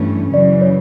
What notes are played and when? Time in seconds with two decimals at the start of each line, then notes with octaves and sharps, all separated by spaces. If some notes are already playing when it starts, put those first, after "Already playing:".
Already playing: G2 E3 A3 C#4
0.33 F#2 C#3 E3 D5
0.62 C#5